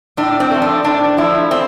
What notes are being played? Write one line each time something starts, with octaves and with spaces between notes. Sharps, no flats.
A2 D4
C4
F3 A3
D4
A2 D4
F3 A3 E4
C4